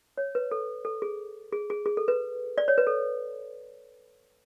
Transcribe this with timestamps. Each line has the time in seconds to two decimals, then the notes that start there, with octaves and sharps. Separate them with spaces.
0.17 C#5
0.35 B4
0.51 A4
0.85 A4
1.02 G#4
1.53 G#4
1.70 G#4
1.86 G#4
1.97 A4
2.08 B4
2.58 D5
2.68 C#5
2.78 B4
2.87 A4